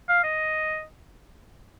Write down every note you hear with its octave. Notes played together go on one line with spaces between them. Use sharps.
F5
D#5